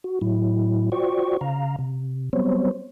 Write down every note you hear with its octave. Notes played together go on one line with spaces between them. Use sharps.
F#4
A2 F#3 E4
F4 F#4 C5 D5 G5 C#6
C#3 F5 A#5
C3
F#3 G3 B3 C4 C5 C#5